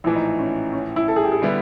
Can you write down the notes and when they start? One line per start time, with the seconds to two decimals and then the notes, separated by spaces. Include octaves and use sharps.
0.04 A#1 A2 E3 E4
0.16 D#4
0.38 C#4
0.73 C#4
0.96 E4
1.08 A4
1.16 G#4
1.24 G4
1.32 G#4
1.42 D3 G3 B3 E4